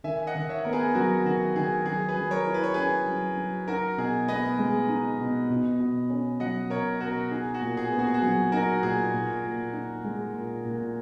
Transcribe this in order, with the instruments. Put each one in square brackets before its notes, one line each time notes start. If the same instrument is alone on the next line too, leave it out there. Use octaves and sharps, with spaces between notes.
[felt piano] D#3 [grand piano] E5 G#5
[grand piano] D#5 F#5
[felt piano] D#3
[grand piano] C#5 E5
[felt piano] B3 [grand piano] A#4
[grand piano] G#4 B4
[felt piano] F#3 [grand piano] F#4 A#4
[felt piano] D#3 [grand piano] F#4
[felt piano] D#3 [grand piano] G#4
[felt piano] F#3 [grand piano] G#4
[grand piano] G#4 B4
[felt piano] F#3
[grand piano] A#4 C#5
[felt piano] E4
[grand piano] B4
C#5
[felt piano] C#4 [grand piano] G#4 B4
[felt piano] F#3
F#3
[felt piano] D#4 [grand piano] F#4 A#4
[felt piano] B2 [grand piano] G#4
[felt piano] B3 [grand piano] B4 D#5
[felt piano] G#3
D#4
B2
B2
B2
C#4
[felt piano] F#3 [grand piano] D#5 F#5
[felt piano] B2 [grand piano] A#4 C#5
[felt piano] B2 [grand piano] F#4 A#4
[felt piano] D#4 [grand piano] G#4
[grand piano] F#4
[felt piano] A#2
[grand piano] G#4
[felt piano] B3
[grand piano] F#4
G#4
F#4
[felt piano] F#3 [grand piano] G#4
[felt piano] D#4 [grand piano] F#4 A#4
[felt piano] A#2 [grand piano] G#4
[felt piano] A#2
A#2
D#4
G#3
A#2
A#2